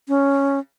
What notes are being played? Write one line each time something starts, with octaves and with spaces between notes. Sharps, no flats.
C#4